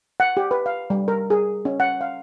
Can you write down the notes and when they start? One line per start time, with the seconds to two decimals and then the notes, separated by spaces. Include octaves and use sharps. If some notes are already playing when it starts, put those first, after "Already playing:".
0.20 F#5
0.37 G4
0.51 B4
0.66 F5
0.90 G3
1.08 A#4
1.30 G#4
1.65 C#4
1.80 F#5
2.01 F5